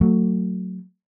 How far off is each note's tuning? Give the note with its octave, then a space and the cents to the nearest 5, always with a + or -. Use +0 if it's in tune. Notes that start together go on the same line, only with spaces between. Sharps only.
F#3 +0 A3 +25